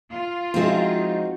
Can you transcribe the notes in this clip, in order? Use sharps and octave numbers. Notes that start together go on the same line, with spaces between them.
F4
F3 G#3 C4 D#4 E4 F#4